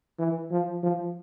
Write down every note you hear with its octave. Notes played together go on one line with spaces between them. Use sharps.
E3
F3
F3